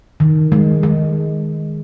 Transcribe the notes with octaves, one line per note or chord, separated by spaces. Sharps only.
D#3
G#3
G#3